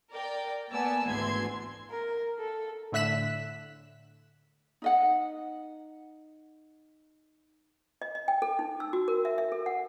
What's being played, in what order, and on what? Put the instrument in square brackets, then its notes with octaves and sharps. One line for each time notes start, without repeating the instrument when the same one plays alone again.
[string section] A#4 D5 G5
A#3 B3 D5 G#5 A5 E6
G#1 D2 E3 B3 C6 G#6
[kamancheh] A#4
A4
[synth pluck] A2 D3 E5 F#6 B6 E7
[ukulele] D#4 D#5 F#5
[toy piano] D#5
D#5
G5
A4
D#4
E6
F#4
A#4
E5
E5
A4
F#5